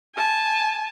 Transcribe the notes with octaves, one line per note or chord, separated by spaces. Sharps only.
G#5 A5